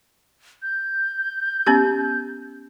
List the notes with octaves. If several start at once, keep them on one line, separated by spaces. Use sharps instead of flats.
G6
B3 C#4 G4